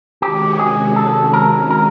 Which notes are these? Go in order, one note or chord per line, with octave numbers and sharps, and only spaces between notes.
C3 D#3 G#3 C#4 F#4 G4
G4
G#4
A4
A#4
A#4